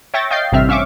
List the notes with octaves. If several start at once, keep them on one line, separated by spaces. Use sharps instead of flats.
C#5 E5 G5 C#6 A6 A#6
D#5 F5 G5 G6 A6 C7
A1 G2 C3 C4 E5 F6
C#4 E5 F5 C#6 D6